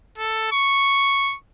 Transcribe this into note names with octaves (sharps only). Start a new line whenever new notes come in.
A4
C#6